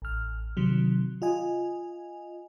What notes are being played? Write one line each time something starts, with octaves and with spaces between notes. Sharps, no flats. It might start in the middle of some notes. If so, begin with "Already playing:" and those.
A1 F6
C3 D#3 F#3
F4 D#5 G#5